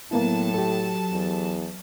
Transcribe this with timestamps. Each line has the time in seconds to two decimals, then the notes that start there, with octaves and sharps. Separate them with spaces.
0.11 A2 F#3 A#3 B3 E4 A5
0.54 G4 A4
1.11 E2